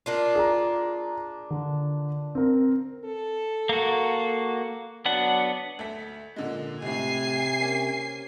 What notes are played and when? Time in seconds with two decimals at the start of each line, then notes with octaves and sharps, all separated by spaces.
0.06 A#3 D4 F4
0.35 G#4 A#5
1.50 D3
2.35 C4 A#4
3.05 A4
3.69 A#3 F#4
5.06 F#3 B3 D4 F#5
5.79 D2 A4 B6
6.36 A#2 D3 G#3
6.82 C#2 A2 C3 G#5 C7
7.59 A#3 C#4